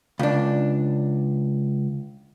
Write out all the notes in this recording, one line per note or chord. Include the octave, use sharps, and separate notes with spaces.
C#2 D4